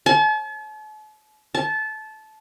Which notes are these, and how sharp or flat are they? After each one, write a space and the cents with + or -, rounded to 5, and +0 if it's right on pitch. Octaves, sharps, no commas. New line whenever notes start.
A5 -45
A5 -20